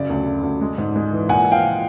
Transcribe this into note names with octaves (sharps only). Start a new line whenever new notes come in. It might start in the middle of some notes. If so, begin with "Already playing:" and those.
Already playing: F#2 C#3 D5
D2
C#3
D2
G#3
G#2
G#3
E3
A#2 F#5 G#5
F3 F5 G5
A#2